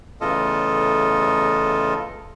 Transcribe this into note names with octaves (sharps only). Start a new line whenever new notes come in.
E2 A2 C#3 F4 A4 D#5